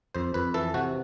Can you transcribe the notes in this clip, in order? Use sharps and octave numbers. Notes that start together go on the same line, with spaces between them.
F2 C5
F2 B4
E3 A4
C3 F#4